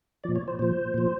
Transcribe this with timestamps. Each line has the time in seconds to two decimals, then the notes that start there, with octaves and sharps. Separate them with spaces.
0.24 A#2 F3 D5
0.36 C#5
0.48 C5
0.59 A#2 F3 C5
0.94 A#2 F3